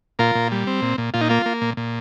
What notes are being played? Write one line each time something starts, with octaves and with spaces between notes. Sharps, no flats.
A#2 F4 A#4
A#2
G3
C4
A#2
A#2
A#2 F4
D#4
A#3 F4
A#3
A#2
A#2